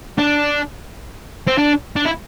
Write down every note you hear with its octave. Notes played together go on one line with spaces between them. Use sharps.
D4
C4
D4
D4
E4